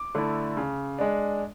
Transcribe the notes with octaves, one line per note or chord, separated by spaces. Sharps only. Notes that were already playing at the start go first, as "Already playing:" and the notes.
Already playing: D6
D3 A3 E4
C#3
G#3 D4